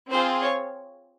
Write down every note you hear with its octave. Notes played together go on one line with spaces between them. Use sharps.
C4 F4 G#4 C5
C#5